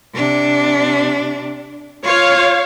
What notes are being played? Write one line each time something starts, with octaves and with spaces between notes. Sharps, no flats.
C3 D4
F4 C#5 F5